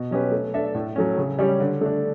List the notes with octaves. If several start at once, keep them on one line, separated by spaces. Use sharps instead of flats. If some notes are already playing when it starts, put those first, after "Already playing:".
Already playing: B2
F#3 C#4 G4 B4
A3
D4 A4 E5
A2
F#3 A3 C#4
C#3
G3 C#4 G4 C#5
D3
A3 D4